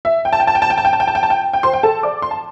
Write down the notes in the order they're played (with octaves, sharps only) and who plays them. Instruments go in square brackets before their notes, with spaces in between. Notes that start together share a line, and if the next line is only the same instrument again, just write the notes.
[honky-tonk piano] E5
G5
A5
G5
A5
G5
A5
G5
A5
G5
A5
G5
A5
G5
A5
G5
G5
C5 C6
G5
A4 A5
D5 D6
C6
A5